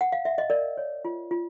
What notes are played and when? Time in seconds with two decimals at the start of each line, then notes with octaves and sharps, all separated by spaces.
0.01 F#5
0.12 F5
0.25 E5
0.38 D#5
0.50 A#4 D5
0.77 C#5
1.05 F4
1.31 F4